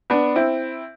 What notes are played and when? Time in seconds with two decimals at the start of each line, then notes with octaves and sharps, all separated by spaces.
0.10 B3 D4
0.36 C4 E4